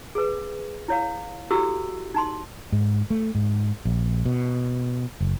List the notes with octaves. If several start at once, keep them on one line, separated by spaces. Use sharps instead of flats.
G#4 B4
E4 C#5 F5
E4 F#4 G4 A4 E6
D#4 A5 C6
G#2
A3
G#2
A#1
B2
F#1